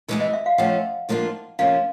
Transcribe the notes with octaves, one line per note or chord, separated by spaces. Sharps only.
C3 E3 G#3 B3
D#5
E5
F5
F3 A3 C#4 F#5
G#2 F3 A#3 D4 F4
F2 C3 F3 A#3 C#4 F5